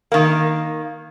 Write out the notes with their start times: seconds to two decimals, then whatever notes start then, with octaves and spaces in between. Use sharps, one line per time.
0.12 D#3 A#3